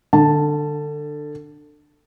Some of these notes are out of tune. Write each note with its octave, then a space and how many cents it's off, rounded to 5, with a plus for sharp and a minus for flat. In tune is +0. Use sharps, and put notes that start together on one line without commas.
D3 +20 A5 +0